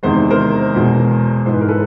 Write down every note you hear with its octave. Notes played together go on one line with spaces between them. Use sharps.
E2 C3 D#3 G#3 C5
A#4 C5
E2 B2 G#3
G#2 E3 G#3 C5
B4
A#4
A4 B4